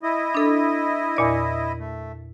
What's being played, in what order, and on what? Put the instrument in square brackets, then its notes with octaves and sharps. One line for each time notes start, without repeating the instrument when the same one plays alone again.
[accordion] E4 D#5
[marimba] D4 A4
E2 A#2 D5
[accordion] A3